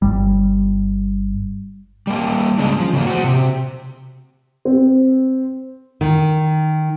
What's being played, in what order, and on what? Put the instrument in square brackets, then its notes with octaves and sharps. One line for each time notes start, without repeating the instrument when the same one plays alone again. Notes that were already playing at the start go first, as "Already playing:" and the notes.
[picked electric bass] G1 G3
[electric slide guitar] G3 A#3
C#3 G#3 C#4 D4
F3
C#3 F3 G#3 A#3
F#4 C5
C3
[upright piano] C4
[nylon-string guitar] D#3